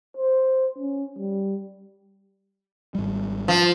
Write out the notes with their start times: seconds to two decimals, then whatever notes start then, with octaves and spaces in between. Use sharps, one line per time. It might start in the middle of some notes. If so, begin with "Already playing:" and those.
0.17 C5
0.78 C#4
1.18 G3
2.95 G#1 G3
3.48 F3